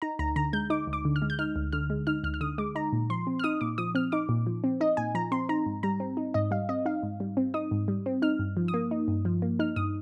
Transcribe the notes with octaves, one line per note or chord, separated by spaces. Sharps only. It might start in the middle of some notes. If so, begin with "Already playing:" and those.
D#4 A#5
D2 A#5
D3 A#5
G#3 G6
D#4 D6
D2
D6
D3
F6
G#3
G6
D#4 F6
D2
D3 F6
G#3
D#4 F6
D2 F6
F6
D3 D#6
G#3 D6
D#4 A#5
A#2
F3 C6
C4
F6
D#4 D#6
A#2 D6
F3 D#6
C4 F6
D#4 D6
A#2
F3
C4
D#4 D#5
A#2 G#5
F3 A#5
C4 C6
D#4 A#5
G#2
G3 A#5
C4
D#4
G#2 D#5
G3 F5
C4 D#5
D#4 F5
G#2
G3
C4
D#4 D#6
G#2
G3
C4
D#4 F6
G2
F3
D#6
A#3
D#4
G2
F3
A#3
D#4 F6
G2 D#6